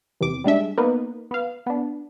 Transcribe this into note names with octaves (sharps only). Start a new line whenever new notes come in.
E2 C3 D6
G3 G#3 D4 E5
A#3 B3 D#4 B4
B3 F5
B3 D4